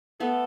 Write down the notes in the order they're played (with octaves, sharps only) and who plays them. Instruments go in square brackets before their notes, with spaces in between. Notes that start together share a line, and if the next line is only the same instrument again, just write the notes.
[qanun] A3 B3 [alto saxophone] A4